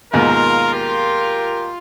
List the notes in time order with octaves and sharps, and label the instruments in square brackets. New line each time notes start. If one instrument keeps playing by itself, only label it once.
[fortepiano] D#2 G#2 B2 [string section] F4 [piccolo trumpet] A#4
[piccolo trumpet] G4 [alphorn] A#4